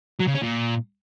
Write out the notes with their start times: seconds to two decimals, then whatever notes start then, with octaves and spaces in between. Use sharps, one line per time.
0.20 F#3
0.27 C#3
0.34 C#4
0.42 A#2